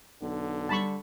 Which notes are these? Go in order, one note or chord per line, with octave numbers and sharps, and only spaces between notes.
B1 D3
G3 A5 B5 C#6